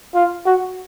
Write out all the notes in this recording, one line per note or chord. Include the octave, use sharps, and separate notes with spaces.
F4
F#4